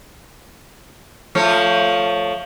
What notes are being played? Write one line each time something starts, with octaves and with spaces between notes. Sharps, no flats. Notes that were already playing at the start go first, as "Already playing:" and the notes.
F3 A3 C#5